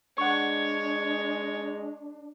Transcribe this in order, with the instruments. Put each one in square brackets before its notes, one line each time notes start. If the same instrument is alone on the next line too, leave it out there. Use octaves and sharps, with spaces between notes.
[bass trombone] G#3 [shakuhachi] D4 [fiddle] C#5 [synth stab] F#5 C#6